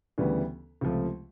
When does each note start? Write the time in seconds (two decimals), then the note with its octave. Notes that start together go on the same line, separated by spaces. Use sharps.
0.18 D2 C#3 E3 G3 B3
0.81 C#2 C3 F3 A3